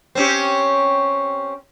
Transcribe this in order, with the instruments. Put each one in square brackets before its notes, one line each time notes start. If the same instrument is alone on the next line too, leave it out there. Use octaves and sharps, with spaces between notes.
[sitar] C4 C#4 G4